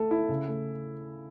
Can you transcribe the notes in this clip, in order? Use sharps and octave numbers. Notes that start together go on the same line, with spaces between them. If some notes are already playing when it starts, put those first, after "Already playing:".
Already playing: A3 A4
E4
C#3
A3